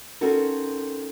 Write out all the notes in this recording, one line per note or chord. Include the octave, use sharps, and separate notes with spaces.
C4 C#4 D#4 F#4 A4 A#4